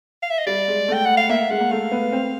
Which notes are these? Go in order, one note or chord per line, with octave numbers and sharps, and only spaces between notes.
F5
E5
D#5
G3 D5
G#3
A3
G5
F#5
F5
A#3 E5
G#3 F#5
A#3
A3 F5
B3
C4